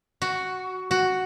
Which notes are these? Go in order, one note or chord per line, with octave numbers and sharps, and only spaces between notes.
F#4
F#4